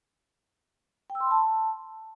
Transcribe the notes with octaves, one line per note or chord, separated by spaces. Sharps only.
G5
E6
C6
B5
A5